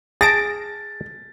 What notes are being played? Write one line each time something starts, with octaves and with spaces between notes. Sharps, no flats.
G#4 A5 A6 A#6 D7